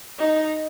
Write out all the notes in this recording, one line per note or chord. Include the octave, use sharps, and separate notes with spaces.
D#4